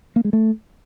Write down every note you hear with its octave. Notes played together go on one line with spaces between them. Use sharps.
A#3
G#3
A3